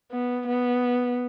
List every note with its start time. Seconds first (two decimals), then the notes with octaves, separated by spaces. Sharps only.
0.11 B3
0.48 B3